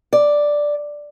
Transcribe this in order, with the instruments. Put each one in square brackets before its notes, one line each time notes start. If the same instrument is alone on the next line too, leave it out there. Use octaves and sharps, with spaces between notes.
[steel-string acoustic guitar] D5